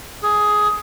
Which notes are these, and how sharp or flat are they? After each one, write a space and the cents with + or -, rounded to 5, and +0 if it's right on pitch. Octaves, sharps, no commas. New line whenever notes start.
G#4 +10